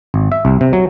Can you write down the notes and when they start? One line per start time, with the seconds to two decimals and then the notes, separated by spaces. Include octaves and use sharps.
0.14 G#1
0.32 E5
0.45 C2
0.61 C3
0.73 F#3